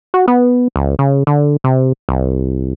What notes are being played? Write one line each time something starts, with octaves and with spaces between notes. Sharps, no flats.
F#4
B3
C#2
C#3
D3
C3
C2